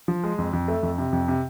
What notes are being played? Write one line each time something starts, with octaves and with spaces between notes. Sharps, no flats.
F3
G#3
F2
F2
A3
F2
C3
F2
C3